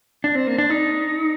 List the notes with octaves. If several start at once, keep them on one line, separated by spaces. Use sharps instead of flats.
D4
C4
A#3
D4
D#4